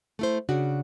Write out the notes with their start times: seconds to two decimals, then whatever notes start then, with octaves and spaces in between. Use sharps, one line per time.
0.19 A3 E4 C5
0.49 C#3 D4 F#4